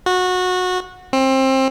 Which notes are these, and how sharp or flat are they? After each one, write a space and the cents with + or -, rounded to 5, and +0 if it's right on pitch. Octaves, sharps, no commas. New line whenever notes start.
F#4 -20
C4 +25